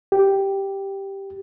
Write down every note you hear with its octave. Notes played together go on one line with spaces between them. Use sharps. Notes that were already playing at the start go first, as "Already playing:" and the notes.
G4